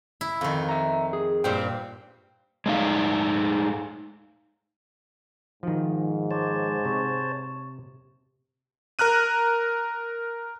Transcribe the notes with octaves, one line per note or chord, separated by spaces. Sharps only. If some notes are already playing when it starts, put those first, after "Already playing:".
E4
F2 D#3 F5
E5 A#5
G#4
G2 A#2 C5 G5
G#3 A3 D4 D#4 F5
G#2 D#3 F3 D#4 F#4
G#3 C5 C#5 A5 D6
C3 C#6
A#4 A#5 F6 F#6 D#7